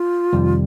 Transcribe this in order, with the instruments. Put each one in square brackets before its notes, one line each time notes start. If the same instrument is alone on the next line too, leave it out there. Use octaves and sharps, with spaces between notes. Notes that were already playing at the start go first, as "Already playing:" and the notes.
Already playing: [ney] F4
[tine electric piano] F2 C3 D#3 G3